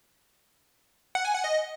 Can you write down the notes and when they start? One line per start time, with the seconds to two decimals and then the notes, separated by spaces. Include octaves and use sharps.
1.15 F#5
1.25 G#5
1.34 F#5
1.44 D#5